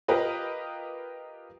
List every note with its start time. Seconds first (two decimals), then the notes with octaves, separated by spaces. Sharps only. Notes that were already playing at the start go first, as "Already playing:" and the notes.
0.08 F4 G4 A#4 B4 D#5